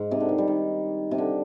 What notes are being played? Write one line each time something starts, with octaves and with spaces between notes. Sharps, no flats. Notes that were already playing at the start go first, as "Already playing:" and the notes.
Already playing: G#2
C3
D3
D#3
G3
D#3
C3
D3